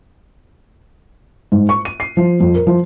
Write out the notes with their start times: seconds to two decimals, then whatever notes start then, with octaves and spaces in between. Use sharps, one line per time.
1.52 G#2
1.69 C#6
1.85 D#7
2.00 C7
2.17 F3
2.40 F2
2.55 A#4
2.67 F3